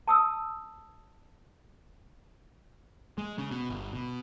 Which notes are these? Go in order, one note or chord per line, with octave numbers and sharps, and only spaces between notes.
A5 D#6 E6
G#3
C#3
B2
G1
B2